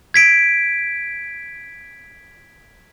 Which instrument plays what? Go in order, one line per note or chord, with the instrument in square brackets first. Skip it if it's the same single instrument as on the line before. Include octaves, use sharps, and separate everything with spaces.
[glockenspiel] G#6 B6 D7